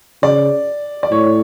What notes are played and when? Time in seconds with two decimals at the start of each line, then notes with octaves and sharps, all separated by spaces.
0.23 C#3 D5
1.03 D5
1.11 A2 C#5